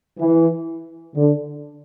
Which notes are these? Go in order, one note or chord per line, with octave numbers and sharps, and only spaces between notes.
E3
D3